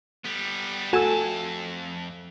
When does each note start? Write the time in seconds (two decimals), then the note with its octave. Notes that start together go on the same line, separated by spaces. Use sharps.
0.24 G3 B3
0.93 F2 A3 F#4 G#5 A5 E6 E7